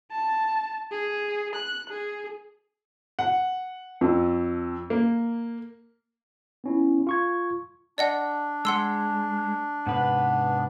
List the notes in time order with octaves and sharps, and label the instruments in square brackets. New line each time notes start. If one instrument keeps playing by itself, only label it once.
[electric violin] A5
G#4
F#6
G#4
[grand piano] F#5
F2
A#3
[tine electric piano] B3 C#4 E4
F4 C#6 G#6
[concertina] D4 [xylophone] D5 D#5 F#5
[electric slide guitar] G#3 [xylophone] F#5 C6 E6
[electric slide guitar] G#2 C3 B4 [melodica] B3